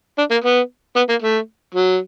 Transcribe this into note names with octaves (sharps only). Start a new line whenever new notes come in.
D4
A#3
B3
B3
A#3
A3
F#3